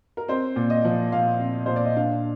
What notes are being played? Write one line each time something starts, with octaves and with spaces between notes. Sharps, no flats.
A#4
C4 C5
A#2
D#5
F3
A#2 F5
C4
A#2 C5
D5
D#5
D4 F5